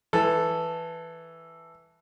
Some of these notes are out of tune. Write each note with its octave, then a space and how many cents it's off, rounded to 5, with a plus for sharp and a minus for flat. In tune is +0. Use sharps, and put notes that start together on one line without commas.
E3 +0 A4 +0